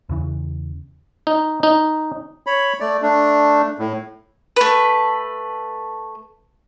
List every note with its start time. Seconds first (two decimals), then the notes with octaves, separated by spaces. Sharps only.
0.09 E2 C#3 E3
1.27 D#4
1.63 D#4
2.47 C#5 B5
2.80 A3 D5
3.02 A3 D4
3.79 A2
4.56 A3 B4